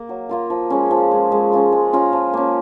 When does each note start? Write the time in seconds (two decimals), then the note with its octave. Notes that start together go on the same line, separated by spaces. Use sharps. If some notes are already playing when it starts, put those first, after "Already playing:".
Already playing: A#3 A#4
0.09 F#3
0.29 A#3 F4 A#4
0.50 F3
0.70 G#3 C#4
0.91 F3
1.11 G#3 C#4
1.32 G#3
1.52 C#4 F4 A#4
1.72 G#3
1.93 C#4 F4 A#4
2.13 F3
2.33 A#3 C#4